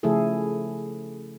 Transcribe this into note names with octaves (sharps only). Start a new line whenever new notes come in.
C#3 F3 A3 E4 G#4 A4